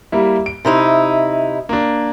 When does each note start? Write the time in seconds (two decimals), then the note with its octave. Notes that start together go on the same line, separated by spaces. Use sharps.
0.12 G3 A#3 E4
0.46 D7
0.65 C3 D#4 E4
1.69 A#3 D4